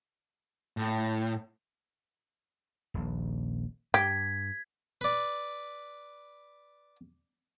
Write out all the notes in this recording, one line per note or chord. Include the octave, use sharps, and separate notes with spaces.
A2
D#1 A#1
G2 G4 G#6 B6
B4 D5